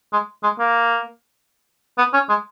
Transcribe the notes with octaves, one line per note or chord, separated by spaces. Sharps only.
G#3
G#3
A#3
B3
C#4
G#3